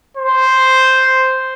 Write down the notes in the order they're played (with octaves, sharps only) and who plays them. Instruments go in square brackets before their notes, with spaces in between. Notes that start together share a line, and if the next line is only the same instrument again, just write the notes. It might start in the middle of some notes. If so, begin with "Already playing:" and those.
[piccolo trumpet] C5